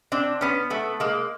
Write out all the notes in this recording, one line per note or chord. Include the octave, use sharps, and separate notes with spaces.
C4 D4
B3 C#4
A3 B3
G#3 A#3